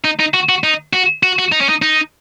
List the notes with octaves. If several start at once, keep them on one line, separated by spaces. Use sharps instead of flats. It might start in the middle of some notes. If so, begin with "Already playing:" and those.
D#4
D#4
F#4
F#4
D#4
F#4
F#4
F#4
D#4
C#4
D#4
D#4